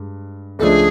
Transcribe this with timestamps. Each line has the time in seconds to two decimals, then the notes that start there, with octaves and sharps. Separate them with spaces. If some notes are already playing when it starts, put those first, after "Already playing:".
Already playing: G2 G#3
0.59 C#2 C#3 F3 A3 D4 G#4 A4